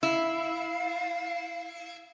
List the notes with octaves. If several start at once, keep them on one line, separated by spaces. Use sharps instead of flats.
E4 F5